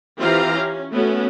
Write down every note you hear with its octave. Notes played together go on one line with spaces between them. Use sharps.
E3 C4 F4 G4 F5 A#5
C#4
A3 B3 C#4 F#4